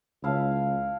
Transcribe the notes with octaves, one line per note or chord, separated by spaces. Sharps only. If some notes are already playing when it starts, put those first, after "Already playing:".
C#2 E4 F5 A5